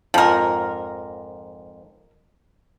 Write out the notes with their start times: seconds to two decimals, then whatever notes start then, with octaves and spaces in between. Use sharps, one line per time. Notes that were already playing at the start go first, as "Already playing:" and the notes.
0.14 F2 G#2 F3 A#4